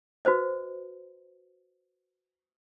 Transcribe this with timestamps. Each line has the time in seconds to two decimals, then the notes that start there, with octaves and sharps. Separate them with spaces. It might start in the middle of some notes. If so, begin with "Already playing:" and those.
0.25 F#4 B4 C5 D#5